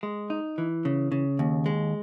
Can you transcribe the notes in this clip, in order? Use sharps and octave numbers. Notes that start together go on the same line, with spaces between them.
G#3
D#4
E3
C#3
C#3
D#2
G#3